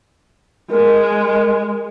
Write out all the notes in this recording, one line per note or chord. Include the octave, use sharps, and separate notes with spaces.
G#3 A#4